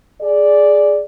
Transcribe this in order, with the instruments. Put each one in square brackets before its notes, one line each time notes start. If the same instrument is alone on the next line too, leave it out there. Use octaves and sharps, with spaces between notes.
[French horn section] G#4 D5